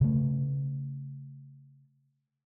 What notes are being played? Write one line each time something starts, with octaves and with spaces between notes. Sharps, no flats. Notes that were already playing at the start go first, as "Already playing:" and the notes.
C#3 A3